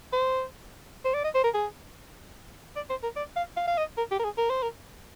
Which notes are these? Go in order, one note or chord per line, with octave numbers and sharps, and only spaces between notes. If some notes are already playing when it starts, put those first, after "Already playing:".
C5
C5
D5
D#5
C5
A#4
G#4
D5
C5
A#4
D5
F5
F5
F5
D#5
A#4
G4
A#4
G#4
A#4
C5
A#4